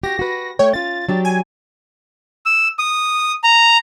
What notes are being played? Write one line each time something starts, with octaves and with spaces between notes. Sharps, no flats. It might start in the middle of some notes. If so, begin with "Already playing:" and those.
F#4 G4 A#6
F#4 B4
A3 C#5 G5
C#4 F4 A6
F#3 D4 G4
G#5
E6
D#6
A#5